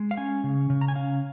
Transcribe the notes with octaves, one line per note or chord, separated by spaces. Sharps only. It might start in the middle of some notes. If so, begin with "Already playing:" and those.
Already playing: G#3
F5
C#4 G#5
C#3
C#3
A#5
G#5
C#4 F5